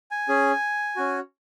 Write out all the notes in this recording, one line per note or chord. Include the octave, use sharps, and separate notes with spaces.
G#5
C#4 G#4
C#4 F#4